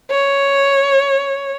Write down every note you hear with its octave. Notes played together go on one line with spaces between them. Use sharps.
C#5